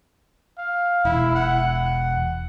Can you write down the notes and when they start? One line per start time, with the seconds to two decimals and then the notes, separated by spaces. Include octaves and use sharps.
0.58 F5
1.05 E1 E4
1.35 F#5